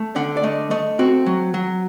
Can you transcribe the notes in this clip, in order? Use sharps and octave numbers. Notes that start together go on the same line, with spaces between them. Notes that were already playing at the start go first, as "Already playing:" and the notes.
Already playing: A3
D3 F#5
D5
A3 D#5
A3 D#5
C4 F#4
F#3
F#3